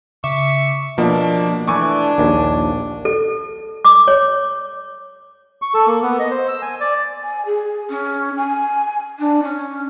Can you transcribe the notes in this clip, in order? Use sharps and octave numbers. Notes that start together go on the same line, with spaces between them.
C#3 E5 C#6 D6
B2 F3 A#3 D4
E3 A3 D4 G#5 C#6 D6
A#1 D#2
A4
D6
C#5
C#6
A4
A#3
B3
D#5
C5
E6
G#5
D5
G#5
G#4
C#4
G#5
D4
C#4